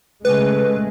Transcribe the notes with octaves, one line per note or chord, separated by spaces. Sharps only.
C#3 G#3 A3 B4